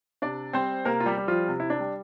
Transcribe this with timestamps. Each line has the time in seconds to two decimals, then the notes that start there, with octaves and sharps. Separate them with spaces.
0.22 C3 D4 D5
0.53 G3 C4 C5
0.85 C3 A#3 A#4
1.00 F4
1.06 G3 G4
1.18 G3
1.28 F3 F4
1.48 C3
1.60 E4
1.70 D4
1.80 G3